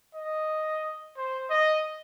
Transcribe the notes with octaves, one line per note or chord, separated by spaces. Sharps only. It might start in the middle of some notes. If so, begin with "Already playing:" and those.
D#5
C5
D#5